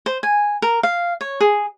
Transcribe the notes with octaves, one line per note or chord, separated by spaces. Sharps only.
C5
G#5
A#4
F5
C#5
G#4